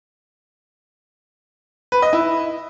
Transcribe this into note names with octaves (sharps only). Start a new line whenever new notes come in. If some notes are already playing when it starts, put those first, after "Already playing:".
B4
D#5
E4